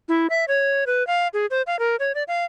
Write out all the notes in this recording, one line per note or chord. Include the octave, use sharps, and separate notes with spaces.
E4
E5
C#5
B4
F5
G#4
C5
F5
A#4
C#5
D5
F5